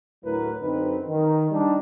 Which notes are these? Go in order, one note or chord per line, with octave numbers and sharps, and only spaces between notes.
D2 A2 F#3 E4 A#4 B4
F#2 D3 C4 D#4 B4
D#3
G3 D4 D#4